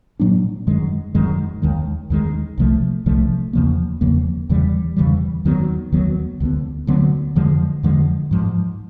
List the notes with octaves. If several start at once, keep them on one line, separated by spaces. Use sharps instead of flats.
A#2 F#3 A#3 D4
F#2 D#3 G#3
F#2 D#3 G#3
D#2 D#3 G#3
D#2 D#3 G#3
C2 C3 F3 A3
C2 C3 F3 A3
E2 C#3 F3 A#3
E2 C#3 F3 A#3
E2 C#3 E3 G3
E2 C#3 E3 G3
D#2 D#3 F#3 B3
D#2 D#3 F#3 B3
D2 D3 F#3 B3
D2 D3 F#3 B3
F2 D3 F3 G#3
F2 D3 F3 G#3
G#2 F3 G#3